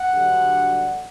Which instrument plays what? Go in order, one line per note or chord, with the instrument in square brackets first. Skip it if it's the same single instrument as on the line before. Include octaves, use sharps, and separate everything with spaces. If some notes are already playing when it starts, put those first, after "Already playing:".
Already playing: [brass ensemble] F#5
G2 D3 F#3